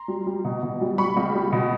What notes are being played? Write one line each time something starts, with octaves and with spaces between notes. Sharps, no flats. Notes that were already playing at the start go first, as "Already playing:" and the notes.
Already playing: A#5 C6
G3
G3
B2
B2
G3
G3 B5 C#6
C#2
G3
B2